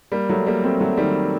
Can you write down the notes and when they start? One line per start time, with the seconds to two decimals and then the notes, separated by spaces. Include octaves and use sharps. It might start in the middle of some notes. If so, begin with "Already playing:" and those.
0.12 G3 A#3
0.29 F#3 A3
0.47 G3 A#3
0.64 A3 C4
0.80 F#3 A3
0.97 D#3 G3